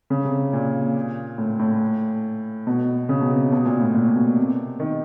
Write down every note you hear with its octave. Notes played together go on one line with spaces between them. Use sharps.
C#3
C3
A#2
A2
A2
B2
C#3
B2
C3
B2
A#2
A2
A#2
B2
C3
D#3